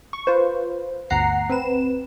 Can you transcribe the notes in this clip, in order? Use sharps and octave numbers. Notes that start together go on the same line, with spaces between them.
C#6
F4 B4 C5
G1 D2 F#5 A#5 C7
C4 B4 E7